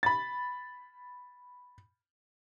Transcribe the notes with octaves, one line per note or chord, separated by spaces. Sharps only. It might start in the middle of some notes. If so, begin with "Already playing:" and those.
B5 A6